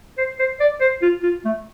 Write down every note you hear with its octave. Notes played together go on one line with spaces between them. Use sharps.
C5
C5
D5
C5
F4
F4
A3